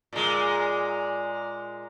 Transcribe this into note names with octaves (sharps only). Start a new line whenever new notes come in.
A#2 G#3